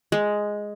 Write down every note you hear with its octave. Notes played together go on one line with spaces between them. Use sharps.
G#3